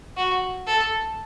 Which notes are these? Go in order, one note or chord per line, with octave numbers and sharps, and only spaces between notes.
F#4
A4